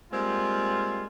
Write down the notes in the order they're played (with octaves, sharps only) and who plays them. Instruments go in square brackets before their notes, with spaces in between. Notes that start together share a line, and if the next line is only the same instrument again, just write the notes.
[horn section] G3 G#3 A#3 C4 F4